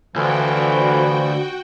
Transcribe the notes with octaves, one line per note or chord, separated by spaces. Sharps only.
D2 D3 E3 F3 F#4 G5